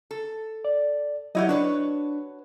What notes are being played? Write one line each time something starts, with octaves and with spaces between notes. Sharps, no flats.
A4
D5
F#3 E4 G4 C#5 D#5 F#5
D4 F#4 B4 C#5